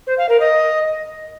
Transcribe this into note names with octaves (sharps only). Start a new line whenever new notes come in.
C5
F5
A#4
D#5